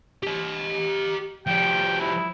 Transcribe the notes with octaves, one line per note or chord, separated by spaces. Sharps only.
G4 D#5
F3 G3 G5
E4